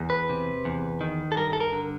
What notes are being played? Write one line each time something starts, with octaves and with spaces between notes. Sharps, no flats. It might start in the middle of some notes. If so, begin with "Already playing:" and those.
Already playing: E2
B4
C3
E2
D#3
A4
G2 A#4
A4
A#4
D3